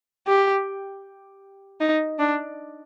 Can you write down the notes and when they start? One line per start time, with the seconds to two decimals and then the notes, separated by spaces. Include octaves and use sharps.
0.28 G4
1.80 D#4
2.19 D4